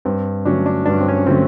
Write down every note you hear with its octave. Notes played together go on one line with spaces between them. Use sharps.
G2 C4
D3 F#3 A3 C#4 D4
D4
G2 D4
C#4
C4
C#4
D3 F#3 A3 C4 C#4